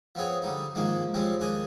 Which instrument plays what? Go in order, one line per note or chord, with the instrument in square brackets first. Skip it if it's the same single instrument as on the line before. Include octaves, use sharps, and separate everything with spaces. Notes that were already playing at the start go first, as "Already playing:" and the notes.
[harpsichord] F3 B3 C4 G#4 C#5
D3 G3 D#4
G#2 D#3 F3 G#3 A#3
F3 G3 G#3 C4 C#4
D#2 D4 G#4 D#5